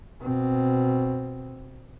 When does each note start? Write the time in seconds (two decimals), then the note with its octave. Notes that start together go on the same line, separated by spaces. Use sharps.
0.21 B2 C4